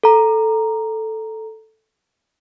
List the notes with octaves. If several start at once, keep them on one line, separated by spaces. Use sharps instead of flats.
A4 A#5